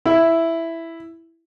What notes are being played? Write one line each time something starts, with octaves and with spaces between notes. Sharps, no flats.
E4